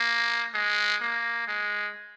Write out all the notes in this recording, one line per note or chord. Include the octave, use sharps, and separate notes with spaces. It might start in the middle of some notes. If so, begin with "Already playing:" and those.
Already playing: A#3
G#3
A#3
G#3